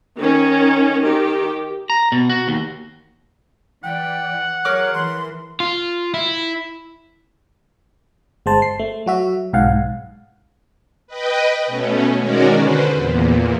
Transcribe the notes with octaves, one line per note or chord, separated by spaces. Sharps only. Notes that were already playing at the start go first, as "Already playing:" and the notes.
D#3 C#4
D#3 G4
A#5
B2
F#4
D#2
E3 D5 F#5 G5
F#3 G#4 A#4 C#5 D6 F6
E3 C6
F4
E4
G1 G#3 C5 A5
C7
A3
F#3 F#4 E5
B1 G#2 F5 F#5
G#2
B4 D#5 G5
B2 A3 C#4
D#3 G#3 C#4 F#4 A#4 D5
D3 B4 C5
E2 A#2